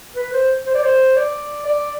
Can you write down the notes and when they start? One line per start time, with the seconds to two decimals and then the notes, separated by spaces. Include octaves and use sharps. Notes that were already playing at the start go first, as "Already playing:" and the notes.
0.16 B4
0.33 C5
0.66 C5
0.74 D5
0.83 C5
1.16 D5
1.66 D5